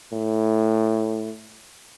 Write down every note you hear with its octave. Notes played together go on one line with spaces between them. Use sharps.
A2